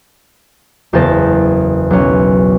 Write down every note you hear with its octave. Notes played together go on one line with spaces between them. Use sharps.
F#1 E2 C5 A5 A6 A#6
B1 C#4